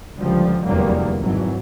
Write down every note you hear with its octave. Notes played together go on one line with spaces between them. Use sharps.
C#2 D3 F3 G3
F1 E2 D3 F#3 G3 A#3
G#1 E3 F#3